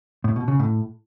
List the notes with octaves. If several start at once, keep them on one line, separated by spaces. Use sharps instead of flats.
A2
B2
C#3
A2